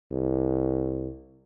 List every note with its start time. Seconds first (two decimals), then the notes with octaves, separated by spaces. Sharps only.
0.12 C2